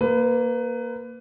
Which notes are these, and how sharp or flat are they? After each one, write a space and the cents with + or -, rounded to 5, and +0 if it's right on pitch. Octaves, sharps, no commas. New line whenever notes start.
A#3 +0 B4 +25